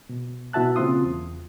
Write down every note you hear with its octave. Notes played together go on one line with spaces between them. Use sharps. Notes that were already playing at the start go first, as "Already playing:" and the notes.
B2
B2 E4 F#4 E5 A5 F#6
C#3 A#3 C4 F4 C6 D#6
E2